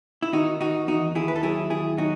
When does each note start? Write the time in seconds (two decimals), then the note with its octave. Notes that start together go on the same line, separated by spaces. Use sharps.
0.22 E4
0.32 D#3 D#4 F#4
0.60 D#3 D#4 F#4
0.87 E2 D#4 F#4
1.15 D#2 E4 G#4
1.28 B4
1.36 A4
1.43 F#3 E4 G#4
1.70 D#2 E4 G#4
1.97 F#3 D#4 F#4